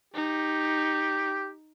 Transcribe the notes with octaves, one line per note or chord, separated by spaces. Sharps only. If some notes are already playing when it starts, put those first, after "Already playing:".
D#4 G4